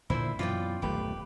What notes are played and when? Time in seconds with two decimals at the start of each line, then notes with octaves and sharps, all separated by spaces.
0.10 A#2 D3 F3 E4 C5 E5
0.39 F#2 B2 E3 F4 D5 G5
0.82 D#1 B1 A3 G4 B4